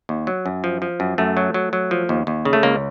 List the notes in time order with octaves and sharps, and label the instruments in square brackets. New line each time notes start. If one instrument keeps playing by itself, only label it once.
[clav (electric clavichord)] D#2
F#3
F#2
F3
F3
F#2
F#2 A3
F#3
F#3
F#3
F3
D#2
D#2
C#3
A3
C#2 A#3